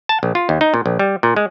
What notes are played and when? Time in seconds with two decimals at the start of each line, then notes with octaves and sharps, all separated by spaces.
0.09 A5
0.23 A#1
0.35 F4
0.49 D#2
0.61 D#4
0.74 A#2
0.86 A#1
0.99 G3
1.23 A#2
1.36 G#3